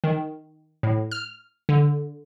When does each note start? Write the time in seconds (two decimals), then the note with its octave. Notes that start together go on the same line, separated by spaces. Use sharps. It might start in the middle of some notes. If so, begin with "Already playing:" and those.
0.04 D#3
0.83 A2
1.11 F6
1.69 D3